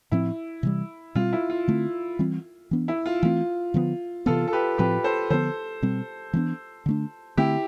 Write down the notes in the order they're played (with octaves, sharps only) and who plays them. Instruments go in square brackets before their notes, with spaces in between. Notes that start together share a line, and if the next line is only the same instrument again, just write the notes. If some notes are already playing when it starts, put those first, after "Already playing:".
[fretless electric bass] A2 F3 C4 [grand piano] E4
[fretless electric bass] C3 E3 G3
[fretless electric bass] B2 G3 C4 [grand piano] F4
[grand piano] E4
F4
[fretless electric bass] D3 A3 C4
E3 G3 C4
E3 B3 D4
[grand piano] E4
F4
[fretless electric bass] E3 A3 C4 [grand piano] F4
[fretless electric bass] D3 F3 B3
[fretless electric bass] C3 E3 B3 [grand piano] F4 A4
[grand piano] A4
G4 B4
[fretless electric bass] A2 F3 C4 [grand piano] G4 B4
[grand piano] A4 C5
[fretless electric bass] D3 F3 B3 [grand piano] A4 C5
[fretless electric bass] B2 G3 C4
E3 G3 B3 D4
D3 A3 D4
[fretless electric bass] D3 A3 C4 [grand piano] E4 G4